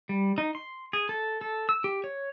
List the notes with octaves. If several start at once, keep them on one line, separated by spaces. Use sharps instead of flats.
G3
D#4
C6
G#4
A4
A4
E6
G4
C#5